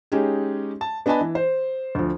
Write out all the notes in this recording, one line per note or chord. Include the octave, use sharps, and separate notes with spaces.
G#3 C#4 D#4 G4 G#4
A5
B3 D4 D#5 G#5 A5 B5
E3
C5
D2 F3